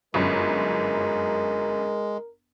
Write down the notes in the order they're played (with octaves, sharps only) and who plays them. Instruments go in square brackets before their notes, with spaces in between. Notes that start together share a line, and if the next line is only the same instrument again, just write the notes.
[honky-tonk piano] G1 F#2 C#4 [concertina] G#3 [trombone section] A#4